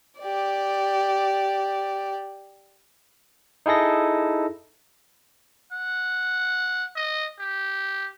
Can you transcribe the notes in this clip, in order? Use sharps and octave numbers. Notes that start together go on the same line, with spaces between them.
G4 D5
D#4 E4 G#4 A4 A#6
F#5
D#5
G4